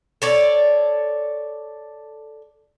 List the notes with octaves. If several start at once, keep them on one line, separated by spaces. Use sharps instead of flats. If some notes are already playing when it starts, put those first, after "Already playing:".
A4 C#5 D5